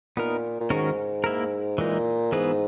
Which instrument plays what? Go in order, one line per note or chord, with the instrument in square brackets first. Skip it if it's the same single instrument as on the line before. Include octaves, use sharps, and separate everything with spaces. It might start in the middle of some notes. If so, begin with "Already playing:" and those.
[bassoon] A#2 [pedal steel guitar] B3 D#4 A#4
[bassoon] A#2
[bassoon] G#2 [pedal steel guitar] D#3 G#3 C#4 F#4 A#4
[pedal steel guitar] A#3 E4 A#4
[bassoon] A#2 [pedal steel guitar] E3 G#3 D#4
[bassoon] G#2 [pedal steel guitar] E3 B3 D#4 G#4 B4